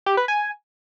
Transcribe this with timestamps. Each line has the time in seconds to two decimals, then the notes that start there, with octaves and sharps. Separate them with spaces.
0.06 G4
0.17 B4
0.28 G#5